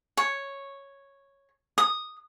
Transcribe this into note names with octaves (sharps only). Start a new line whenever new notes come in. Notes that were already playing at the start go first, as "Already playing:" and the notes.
C#5
D#6